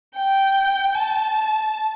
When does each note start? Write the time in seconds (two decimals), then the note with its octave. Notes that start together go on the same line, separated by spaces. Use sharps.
0.16 G5
0.95 A5